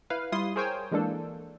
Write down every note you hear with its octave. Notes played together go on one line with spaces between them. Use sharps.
E4 B4 F5
G3 E4 F4 C6 D#6
G#4 A#4 C5 C#5 G5 G#5
E3 G#3 A#3 D4 A4